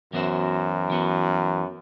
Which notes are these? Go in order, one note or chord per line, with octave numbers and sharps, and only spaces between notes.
F#2 E3 B3 F#4 C5 E5
E3 B3 F#4 B4